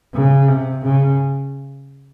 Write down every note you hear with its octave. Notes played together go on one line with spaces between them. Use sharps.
C#3
C3
C#3